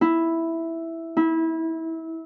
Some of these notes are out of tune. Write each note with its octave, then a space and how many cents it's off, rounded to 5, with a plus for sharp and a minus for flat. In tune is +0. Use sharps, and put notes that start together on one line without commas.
E4 +0
E4 -25